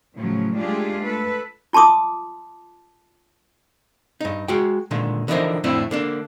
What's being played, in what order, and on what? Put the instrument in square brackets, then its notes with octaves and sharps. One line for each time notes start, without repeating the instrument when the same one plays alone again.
[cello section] A2 C#3 F3 F#3 C#4
G#3 A3 D4 F4 G4 G#4
A4 B4
[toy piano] F4 A5 C6 D6 D#6
[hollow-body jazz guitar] G2 D#4
G#3 F#4 G5
A#2 D3 D#3 G#3
D3 E3 F3 D#4 A#4 C5
F2 A2 D3 A3 C4 E4
D3 A#3 D4